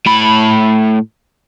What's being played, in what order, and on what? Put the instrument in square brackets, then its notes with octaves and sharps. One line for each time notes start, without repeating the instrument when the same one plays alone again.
[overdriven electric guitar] A2 B5